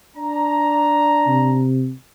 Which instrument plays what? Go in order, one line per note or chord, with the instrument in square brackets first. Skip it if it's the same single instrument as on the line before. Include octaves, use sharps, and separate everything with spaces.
[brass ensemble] D4 A#5
[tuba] C3